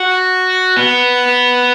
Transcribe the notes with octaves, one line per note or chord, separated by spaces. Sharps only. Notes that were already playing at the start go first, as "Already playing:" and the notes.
Already playing: F#4
B3